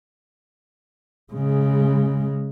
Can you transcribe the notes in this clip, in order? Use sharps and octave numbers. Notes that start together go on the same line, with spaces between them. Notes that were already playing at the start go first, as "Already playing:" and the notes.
C#3 G#3